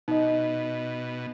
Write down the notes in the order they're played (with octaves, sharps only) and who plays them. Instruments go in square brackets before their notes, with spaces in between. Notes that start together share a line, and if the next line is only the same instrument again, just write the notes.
[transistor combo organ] B2 [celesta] D#4 D#5